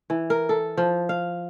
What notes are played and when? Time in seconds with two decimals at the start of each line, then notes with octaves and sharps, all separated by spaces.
0.10 E3
0.30 A#4
0.49 A4
0.77 F3
1.09 F5